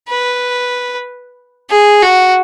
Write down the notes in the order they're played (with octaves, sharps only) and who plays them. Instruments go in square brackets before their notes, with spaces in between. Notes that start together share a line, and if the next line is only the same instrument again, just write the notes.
[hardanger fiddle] B4
G#4
F#4